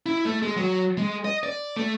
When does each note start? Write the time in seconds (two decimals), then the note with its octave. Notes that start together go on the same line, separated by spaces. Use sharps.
0.06 E4
0.25 A3
0.42 G#3
0.56 F#3
0.97 G#3
1.25 D#5
1.43 D5
1.76 A3